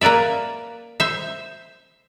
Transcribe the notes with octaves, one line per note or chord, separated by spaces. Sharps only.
A#3 A#4 B4 D5 E5
C5 E5